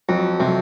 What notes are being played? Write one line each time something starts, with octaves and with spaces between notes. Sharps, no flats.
F2 F#3
C3 F#3